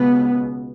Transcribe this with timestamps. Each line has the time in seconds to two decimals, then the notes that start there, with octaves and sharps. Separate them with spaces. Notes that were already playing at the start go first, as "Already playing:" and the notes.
Already playing: C#2 B2 B3